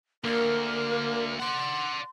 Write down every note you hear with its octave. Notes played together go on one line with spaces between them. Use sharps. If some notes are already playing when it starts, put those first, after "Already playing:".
D2 D3 A#3 A#4
D5 F#5 C6